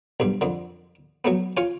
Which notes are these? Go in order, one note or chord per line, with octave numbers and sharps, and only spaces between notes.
B1 G2
F2 D3
F#3 A3 B3
F4 C#5 G#5